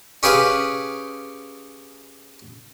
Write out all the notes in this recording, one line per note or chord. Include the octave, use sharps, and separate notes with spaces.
C#4 G4 G#4 B4 F5